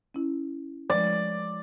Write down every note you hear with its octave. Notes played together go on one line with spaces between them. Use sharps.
C#4 E4
F3 G#3 D5